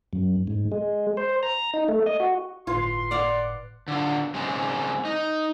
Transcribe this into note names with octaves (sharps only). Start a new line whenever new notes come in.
F#2
G#2
G#3
C5
A#5
D#4
A3
D#5
F#4
G1 A2 F4 B4 C6
D5 F5 F#5
D3 F4
C#3 G#3 C4
D#4